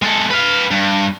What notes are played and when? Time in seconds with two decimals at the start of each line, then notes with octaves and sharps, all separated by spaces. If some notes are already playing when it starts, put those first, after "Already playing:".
0.02 G#3 A4
0.30 B4 F5
0.71 G2